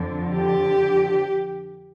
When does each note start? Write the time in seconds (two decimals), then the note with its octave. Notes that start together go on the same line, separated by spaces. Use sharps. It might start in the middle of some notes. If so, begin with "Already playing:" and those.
Already playing: F2 D3 F3
0.35 G4